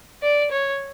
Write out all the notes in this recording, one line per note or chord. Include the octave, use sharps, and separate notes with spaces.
D5
C#5